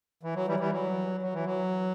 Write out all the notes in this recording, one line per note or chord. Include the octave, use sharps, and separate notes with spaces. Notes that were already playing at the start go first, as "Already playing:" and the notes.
E3
F#3
E3 G3
E3 G3
F#3
F#3
E3
F#3